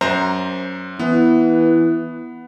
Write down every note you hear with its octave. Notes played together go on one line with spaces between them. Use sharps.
F#2 C5 A#5
E3 B3